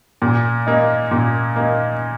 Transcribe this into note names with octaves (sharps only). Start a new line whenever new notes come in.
A#2
A#3 D#4
A#2
A#3 D#4